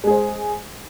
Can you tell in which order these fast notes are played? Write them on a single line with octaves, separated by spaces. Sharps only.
G#3 G#4 C5